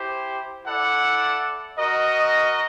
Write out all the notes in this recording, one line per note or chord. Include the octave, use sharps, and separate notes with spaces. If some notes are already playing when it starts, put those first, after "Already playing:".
Already playing: E4 G4 C5
E4 A4 D5 F#5
F#4 A#4 D#5